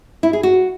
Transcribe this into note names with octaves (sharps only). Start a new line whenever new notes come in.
E4
G#4
F#4